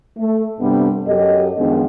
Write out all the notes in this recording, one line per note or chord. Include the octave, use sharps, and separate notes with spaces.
A3
G2 C3 G3 A3 B3 D4
F#2 F#3 G4 A4 D#5
F#2 D#3 F3 G#3 B3 D4